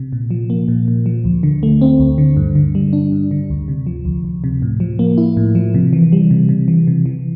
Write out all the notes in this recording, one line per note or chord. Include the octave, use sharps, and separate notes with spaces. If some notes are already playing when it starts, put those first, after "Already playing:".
Already playing: C3
A#2
F3
A#3
A#2
A#2
F3
D2
D3
A3
C4
D2
D3
G2
D3
G3
D4
G2
D3
D2
C3
F3
D2
D2
C3
A2
F3
A#3
E4
A2
F3
C3
E3
G3
C3
C3
E3
C3
E3